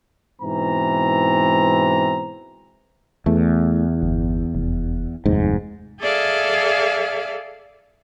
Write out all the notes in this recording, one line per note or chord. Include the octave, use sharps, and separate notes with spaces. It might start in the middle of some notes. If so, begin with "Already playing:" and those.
G#2 B2 E3 C4 A#5
E2 A3
G1
F1
F1 D#2 G#2
G#4 A4 D5 E5 F5